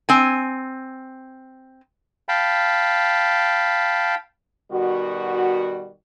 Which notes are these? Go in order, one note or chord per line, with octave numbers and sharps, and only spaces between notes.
C4 G#5
F5 G5 A5 B5
B2 D#3 G3 F#4